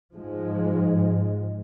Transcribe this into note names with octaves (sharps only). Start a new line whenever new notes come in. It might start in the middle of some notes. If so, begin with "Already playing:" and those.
G#2 F3 G#3